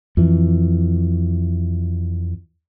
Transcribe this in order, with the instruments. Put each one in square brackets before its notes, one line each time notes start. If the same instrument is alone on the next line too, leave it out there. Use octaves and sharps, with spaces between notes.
[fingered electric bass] F2 E3